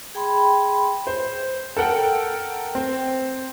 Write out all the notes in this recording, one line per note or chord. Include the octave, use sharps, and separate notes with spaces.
G#4 G5 B5 C6
C5
A4 A#4 F#5 G5
C4